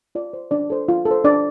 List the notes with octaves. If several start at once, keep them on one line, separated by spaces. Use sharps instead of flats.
F4 D5
C5
D4 D5
A4 C5
F4
A4
C5
D4 D5